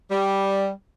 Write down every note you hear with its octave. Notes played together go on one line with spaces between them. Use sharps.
G3